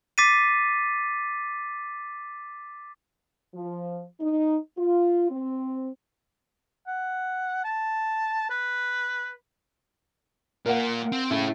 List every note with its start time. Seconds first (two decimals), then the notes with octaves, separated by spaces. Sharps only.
0.18 D6 A6 B6 C7 D#7
3.54 F3
4.20 D#4
4.77 F4
5.29 C4
6.87 F#5
7.65 A5
8.50 B4
10.66 A#2 A#4 F5 F#5
11.12 C4
11.31 A2 C#3 A3 E4 A4